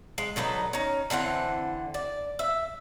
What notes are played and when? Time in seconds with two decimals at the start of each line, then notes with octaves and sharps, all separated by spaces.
0.18 G#3
0.36 D3 F#3 D#4 B4
0.73 C#4 D#4
1.10 D3 E3 C4 F#5
1.94 D5
2.39 E5